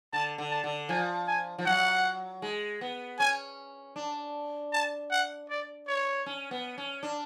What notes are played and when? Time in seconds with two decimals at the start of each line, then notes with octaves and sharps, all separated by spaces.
0.13 D3 A5
0.38 D3
0.51 A5
0.64 D3
0.89 F3 G#5
1.28 G#5
1.58 F3
1.66 F#3 F#5
2.42 G#3
2.81 B3
3.19 C#4 G#5
3.96 D4
4.73 A5
5.11 F#5
5.50 D5
5.88 C#5
6.26 C#4
6.51 B3
6.78 C#4
7.03 D4